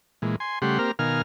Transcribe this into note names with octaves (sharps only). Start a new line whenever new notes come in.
A#2 E3 G#3
G#5 C6
C#3 G3 A3 G4 F#5 C6
A#3 C4 G4 A#4 F6
B2 D#3 A#4 F5 G#5 F6